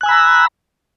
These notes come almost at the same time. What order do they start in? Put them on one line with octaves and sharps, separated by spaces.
F#6 G#5 E6 B5 A#5